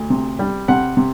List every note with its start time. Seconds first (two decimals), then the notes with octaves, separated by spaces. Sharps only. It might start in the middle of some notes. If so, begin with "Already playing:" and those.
Already playing: D2
0.10 C3
0.39 G3
0.68 C3 F#5
0.97 C3